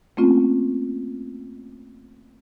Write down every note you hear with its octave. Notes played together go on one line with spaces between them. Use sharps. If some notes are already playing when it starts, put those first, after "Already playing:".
A3 A#3 C4 C#4 F4